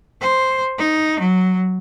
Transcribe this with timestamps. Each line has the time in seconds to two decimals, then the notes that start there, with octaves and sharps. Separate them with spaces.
0.21 C5
0.78 D#4
1.19 F#3